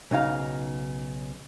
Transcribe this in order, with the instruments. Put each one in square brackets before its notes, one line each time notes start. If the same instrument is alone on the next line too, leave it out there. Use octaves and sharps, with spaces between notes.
[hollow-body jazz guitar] B1 C#3 D#4 F5